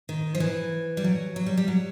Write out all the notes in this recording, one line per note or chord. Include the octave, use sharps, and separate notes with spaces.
D#3
F3
E3
G3
F#3
F#3
G3
G3
F#3